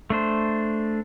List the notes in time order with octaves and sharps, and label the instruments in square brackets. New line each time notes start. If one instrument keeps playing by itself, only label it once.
[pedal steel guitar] A3 D4 C5